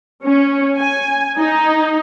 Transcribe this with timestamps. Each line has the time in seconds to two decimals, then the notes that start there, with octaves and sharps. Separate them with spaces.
0.24 C#4
0.76 G#5
1.38 D#4